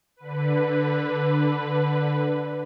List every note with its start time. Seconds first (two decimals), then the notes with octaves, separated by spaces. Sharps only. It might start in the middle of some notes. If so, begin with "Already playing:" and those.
0.16 D3 B4